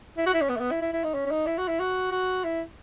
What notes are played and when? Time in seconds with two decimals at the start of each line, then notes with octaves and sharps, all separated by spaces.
0.17 E4
0.26 F#4
0.34 E4
0.41 C#4
0.49 B3
0.56 A3
0.60 B3
0.71 E4
0.81 E4
0.93 E4
1.04 D#4
1.14 C#4
1.26 C#4
1.31 D#4
1.46 E4
1.58 F#4
1.68 E4
1.80 F#4
2.11 F#4
2.44 E4